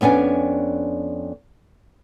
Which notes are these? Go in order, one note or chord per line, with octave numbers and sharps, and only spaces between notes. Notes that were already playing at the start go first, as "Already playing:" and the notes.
F2 B3 C#4 D4 G#5